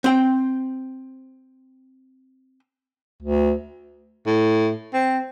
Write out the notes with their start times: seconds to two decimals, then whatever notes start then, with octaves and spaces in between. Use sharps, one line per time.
0.04 C4 G5
3.22 D2
4.26 A2
4.93 C4